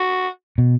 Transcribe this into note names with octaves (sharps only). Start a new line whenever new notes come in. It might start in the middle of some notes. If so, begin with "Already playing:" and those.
Already playing: F#4
B2